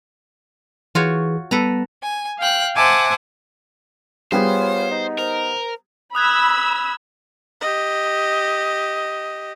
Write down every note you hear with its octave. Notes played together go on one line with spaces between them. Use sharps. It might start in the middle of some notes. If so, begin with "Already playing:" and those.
E3 F4 F#4 G#4 C#5
G3 B3 A4 B4 A#5
G#5
F5 G5 F#6
C5 E5 F#5 G#5 A5 D6
G3 B3 F4 G#4 C5 C#5
D#4
A#4 C5
B5 D#6 E6 F#6 G#6
G4 D#5